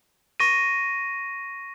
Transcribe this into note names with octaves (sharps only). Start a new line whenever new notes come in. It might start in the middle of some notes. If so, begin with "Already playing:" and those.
C#6 A#6 D#7